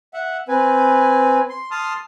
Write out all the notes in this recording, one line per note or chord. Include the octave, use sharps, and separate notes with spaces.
E5 F#5
C4 B4 G#5
C6
A5 C6 D#6 F6